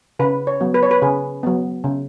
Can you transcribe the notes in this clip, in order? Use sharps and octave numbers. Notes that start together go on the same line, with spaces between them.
C#3 B4
C#5
F#3 B3
B4
C#5
B4
C#3 G#4
F#3 B3
C#3